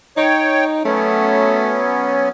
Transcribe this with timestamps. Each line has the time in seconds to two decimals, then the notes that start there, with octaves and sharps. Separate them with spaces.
0.17 D#4 C#5 G5
0.85 F#3 A3 B3 C#4